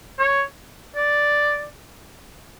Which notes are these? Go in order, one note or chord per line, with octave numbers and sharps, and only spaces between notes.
C#5
D5